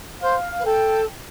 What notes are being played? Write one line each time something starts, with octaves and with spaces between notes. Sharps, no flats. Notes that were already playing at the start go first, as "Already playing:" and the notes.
C5 F5
B4
A4 G5